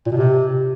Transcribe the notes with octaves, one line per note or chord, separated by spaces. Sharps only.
A#2
B2
C3